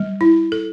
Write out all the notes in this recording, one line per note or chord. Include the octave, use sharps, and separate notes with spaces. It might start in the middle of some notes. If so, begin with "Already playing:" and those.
Already playing: G3
E4
A4